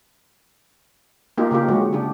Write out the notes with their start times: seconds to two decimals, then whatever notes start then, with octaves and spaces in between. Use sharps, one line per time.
1.38 A#3 D#4 F4 G4
1.51 C#3 A#3 F4 G4
1.69 D3 F#3 G#3 F#4
1.93 C#3 D4 G4